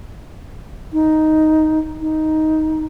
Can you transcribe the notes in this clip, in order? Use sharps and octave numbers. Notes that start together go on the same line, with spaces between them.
D#4
D#4